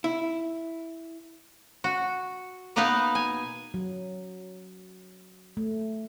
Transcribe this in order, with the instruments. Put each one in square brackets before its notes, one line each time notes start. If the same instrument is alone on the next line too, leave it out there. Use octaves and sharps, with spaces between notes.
[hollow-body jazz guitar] E4
[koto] F#4
B2 A#3 B3 D#4 B4 F5
G#5
[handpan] F#3
A3